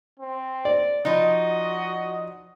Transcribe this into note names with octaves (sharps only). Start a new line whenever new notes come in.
C4
D5
F3 D#4 F#4 D#5